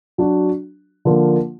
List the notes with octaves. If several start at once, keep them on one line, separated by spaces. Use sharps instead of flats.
F#3 D4 F#4
D3 F3 A#3 F4